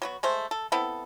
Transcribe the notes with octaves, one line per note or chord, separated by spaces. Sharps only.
F#3 B3 F#4
G#3 A3 C5
A4
B3 C4 E4 A4